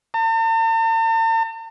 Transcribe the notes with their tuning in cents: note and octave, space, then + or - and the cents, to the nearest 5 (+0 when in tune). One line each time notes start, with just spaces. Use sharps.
A5 +45